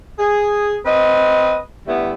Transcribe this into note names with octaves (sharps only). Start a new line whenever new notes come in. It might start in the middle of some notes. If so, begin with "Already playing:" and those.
G#4
C4 B4 D#5
D3 G3 A3 B3 E4